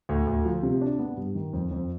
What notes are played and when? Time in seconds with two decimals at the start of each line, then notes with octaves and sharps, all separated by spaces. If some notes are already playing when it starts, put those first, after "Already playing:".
0.09 D2
0.27 D2
0.45 F3
0.63 C3
0.81 D4
0.99 B3
1.17 G2
1.35 D#3
1.53 F2
1.71 F2